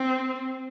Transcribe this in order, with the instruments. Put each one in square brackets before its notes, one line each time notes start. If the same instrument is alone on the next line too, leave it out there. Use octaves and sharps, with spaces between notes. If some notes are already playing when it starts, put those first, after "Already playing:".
Already playing: [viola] C4